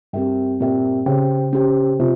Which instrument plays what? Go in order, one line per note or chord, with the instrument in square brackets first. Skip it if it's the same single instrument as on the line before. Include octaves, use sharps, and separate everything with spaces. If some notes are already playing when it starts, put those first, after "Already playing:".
[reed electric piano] G2 [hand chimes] C4 G4 A#4 E5 G5
[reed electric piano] A#2 [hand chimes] C4 G4 A#4 E5 G5
[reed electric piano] C#3 [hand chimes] C#4 G4 C5 G5
[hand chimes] C#4 G4 C5 G5
[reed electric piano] C3 [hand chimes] F4